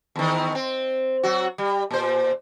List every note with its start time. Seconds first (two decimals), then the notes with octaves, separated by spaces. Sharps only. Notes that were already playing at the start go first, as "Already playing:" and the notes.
0.16 E2 D#3
0.55 C4
1.23 F#3 F#4
1.58 G3
1.90 A#2 C5